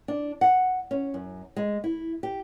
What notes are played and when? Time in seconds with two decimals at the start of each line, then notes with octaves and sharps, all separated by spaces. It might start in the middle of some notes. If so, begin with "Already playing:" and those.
0.08 D4
0.41 F#5
0.91 C#4
1.14 F#2
1.56 G#3
1.84 E4
2.23 G4